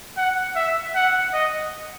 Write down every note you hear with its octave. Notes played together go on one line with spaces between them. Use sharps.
F#5
E5
F#5
D#5